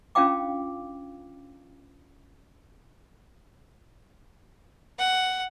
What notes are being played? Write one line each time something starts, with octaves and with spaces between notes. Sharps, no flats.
C#4 D4 F4 F5 G5 D6
F#5